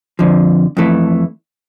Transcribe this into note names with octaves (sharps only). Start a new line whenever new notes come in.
F2 D3 F3
F2 E3 A3